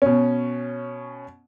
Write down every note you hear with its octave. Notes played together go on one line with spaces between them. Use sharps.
B2 C#4